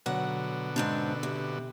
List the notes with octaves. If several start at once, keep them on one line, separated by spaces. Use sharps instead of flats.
B2 D3 F#3 F#5
G#2 C4 D4
C3